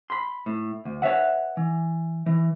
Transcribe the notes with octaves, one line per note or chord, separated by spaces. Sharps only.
B5 C6
A2
D2
B4 C#5 D5 E5 F#5
E3
E3